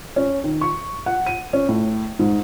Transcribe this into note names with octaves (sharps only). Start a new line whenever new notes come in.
C#4
D#3
C#6
F#5
D#7
C#4
A2
G#2